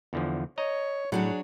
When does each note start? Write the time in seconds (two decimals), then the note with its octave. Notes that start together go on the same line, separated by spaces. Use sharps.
0.13 E2 D3 F3
0.58 C#5 D#5 A#5
1.12 A2 F#3 D4 F#4 G#4